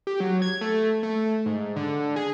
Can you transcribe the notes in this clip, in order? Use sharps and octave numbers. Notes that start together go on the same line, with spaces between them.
G4
F#3
G#6
A3
A3
G#2
D3
G#4